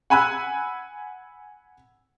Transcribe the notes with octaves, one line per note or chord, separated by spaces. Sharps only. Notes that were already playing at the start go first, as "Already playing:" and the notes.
F#5 G#5 B5 E6 F#6